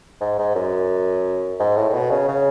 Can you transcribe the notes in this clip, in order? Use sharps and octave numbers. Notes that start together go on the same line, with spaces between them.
G#2
G#2
F#2
G#2
A2
A2
B2
C#3
C#3